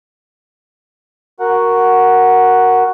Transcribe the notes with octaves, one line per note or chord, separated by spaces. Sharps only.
F#4 A#4 F#5